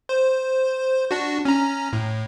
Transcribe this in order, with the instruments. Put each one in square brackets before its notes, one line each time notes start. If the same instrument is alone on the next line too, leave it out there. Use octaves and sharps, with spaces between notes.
[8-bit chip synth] C5
D4 F#4
C#4 A#5
A2